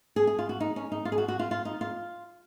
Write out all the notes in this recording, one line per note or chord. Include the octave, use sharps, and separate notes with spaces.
G#4
G#4
F4
F#4
D#4
C#4
D#4
F4
G#4
F#4
F#4
F4
F4
D#4
F4